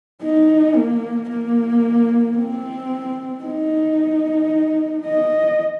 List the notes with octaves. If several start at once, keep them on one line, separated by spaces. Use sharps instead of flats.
D#4
A#3
A#3
C4
D#4
D#5